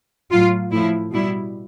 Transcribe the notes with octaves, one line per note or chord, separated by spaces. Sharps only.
A2 F#3 F4
A2 F3 E4
B2 G3 E4